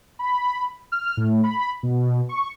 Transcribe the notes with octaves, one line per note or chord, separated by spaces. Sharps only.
B5
F6
A2
B5
B2
C#6